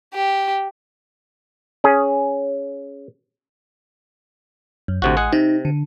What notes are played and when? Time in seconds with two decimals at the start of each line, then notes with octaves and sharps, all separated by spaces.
0.14 G4
1.84 C#4 G#4
4.88 F#2
5.02 A1 D2 C3 F#4
5.17 G#3 G#4 F#5
5.33 C3 D#4
5.65 D3